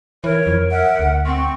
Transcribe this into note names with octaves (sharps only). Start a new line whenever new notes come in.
E3 A#4 C#5
F2
E5 F#5
D2
C4 C6 C#6